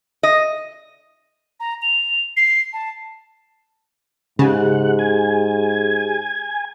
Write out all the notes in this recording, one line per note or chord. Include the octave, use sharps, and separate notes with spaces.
D#5
A#5
F7
C7
A5
G#2 C#3 G4 G#4 F#5
G#5